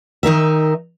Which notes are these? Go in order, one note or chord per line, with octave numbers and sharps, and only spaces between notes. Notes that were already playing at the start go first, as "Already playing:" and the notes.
D#3 D#4 A#4 E5